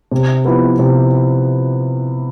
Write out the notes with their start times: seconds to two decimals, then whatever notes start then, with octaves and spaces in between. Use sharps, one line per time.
0.12 C3
0.45 F3 B3 E4 B4
0.79 C3